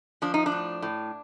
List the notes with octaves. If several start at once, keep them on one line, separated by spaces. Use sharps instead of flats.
F3 D4
D#4
D4
A2
A2